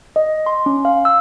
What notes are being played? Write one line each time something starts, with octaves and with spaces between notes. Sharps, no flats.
D#5
C6
C#4
F5
E6